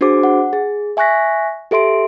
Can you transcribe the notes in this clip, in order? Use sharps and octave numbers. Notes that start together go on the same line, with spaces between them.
D4 F#4 G#4 C5 D6
F#5
G#4
E5 G#5 C#6 F#6 A#6 B6
G4 A4 E5 C6 D7